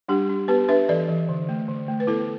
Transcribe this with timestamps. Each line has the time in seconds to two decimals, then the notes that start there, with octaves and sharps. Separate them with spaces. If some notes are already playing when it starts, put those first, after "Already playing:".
0.08 G3 D4 G4
0.29 D4
0.48 B3 G4 B4
0.68 D4 B4 E5
0.89 E3 A4 D5
1.08 E3
1.29 D3
1.49 A3
1.68 D3
1.88 A3
2.00 B4
2.07 B3 E4 A4